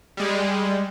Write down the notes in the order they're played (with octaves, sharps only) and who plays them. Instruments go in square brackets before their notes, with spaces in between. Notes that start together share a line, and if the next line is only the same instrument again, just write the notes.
[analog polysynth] G3 G#3